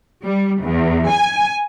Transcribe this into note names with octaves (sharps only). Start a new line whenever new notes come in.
G3
E2
G#5